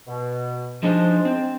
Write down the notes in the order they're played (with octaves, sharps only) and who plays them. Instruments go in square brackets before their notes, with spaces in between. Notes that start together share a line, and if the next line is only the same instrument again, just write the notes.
[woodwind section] B2
[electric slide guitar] F3 D#4 C5 [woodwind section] G#3 D4
[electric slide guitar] C4